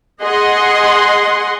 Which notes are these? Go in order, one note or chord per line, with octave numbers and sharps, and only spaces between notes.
G#4 D#5 F#5 C6